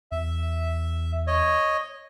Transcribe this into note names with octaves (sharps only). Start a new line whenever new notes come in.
E2 E5
C#5 D#5